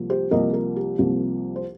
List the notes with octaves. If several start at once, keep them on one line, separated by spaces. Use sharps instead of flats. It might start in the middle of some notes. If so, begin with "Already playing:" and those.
Already playing: C2 C3 F3 A#3
G4 C5
C2 C3 F3 A#3 A#4 D#5
A#4
G4
C2 C3 F3 A#3
C5